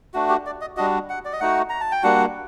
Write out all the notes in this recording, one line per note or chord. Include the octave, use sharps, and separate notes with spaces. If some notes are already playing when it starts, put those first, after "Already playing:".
A3 D4 F#4
G4
D5
D#5
G3 D4 F#4 D#5
F#5
D5
D#5
A3 D#4 F#4 F#5
A#5
A5
G5
G3 A#3 D4 F#4 F#5